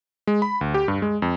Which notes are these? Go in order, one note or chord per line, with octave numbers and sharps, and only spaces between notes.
G#3
B5
D2
G4
G2
G#3
F2